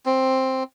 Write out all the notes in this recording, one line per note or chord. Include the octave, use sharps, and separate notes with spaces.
C4